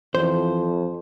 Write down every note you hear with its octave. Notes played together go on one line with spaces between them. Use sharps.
F2 E3 C5